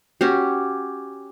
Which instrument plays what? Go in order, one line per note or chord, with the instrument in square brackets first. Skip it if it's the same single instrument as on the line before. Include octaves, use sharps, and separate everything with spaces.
[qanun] C#4 F#4 G4